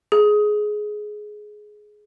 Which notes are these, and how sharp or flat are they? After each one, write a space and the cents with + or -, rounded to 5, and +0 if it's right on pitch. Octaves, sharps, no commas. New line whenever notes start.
G#4 +15